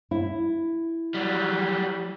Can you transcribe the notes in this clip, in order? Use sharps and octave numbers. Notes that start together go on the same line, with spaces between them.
E4
F#3 G3